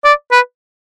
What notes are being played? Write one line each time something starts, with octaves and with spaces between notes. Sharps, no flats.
D5
B4